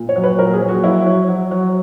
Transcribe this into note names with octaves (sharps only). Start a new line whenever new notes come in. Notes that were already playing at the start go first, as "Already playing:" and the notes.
Already playing: A#2
C#5
F#3
B4
A#2 A#4
G#4
F#3
F#4
F#3 E4
F#3
F#3
F#3